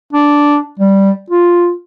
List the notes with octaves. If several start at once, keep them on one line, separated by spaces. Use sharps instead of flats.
D4
G3
F4